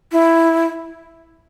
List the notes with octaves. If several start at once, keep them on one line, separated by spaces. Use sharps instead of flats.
E4